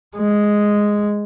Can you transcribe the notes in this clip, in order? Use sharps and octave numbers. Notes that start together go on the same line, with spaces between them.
G#3